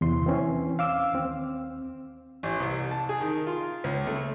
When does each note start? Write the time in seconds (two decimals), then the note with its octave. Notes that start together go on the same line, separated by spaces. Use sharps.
0.01 E2 C3 C6
0.26 E3 C4 C#4
0.79 F5 D6 E6
1.13 D#2 C4
2.43 A1
2.60 C2
2.91 A5
3.09 G#4
3.21 D#3
3.47 F4
3.84 C#2
4.07 A3